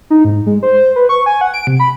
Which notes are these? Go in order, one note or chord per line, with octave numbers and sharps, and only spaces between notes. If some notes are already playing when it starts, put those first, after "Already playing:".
D#4
G#2
G#3
C5
B4
C#6
G#5
F#5
D7
C3
B5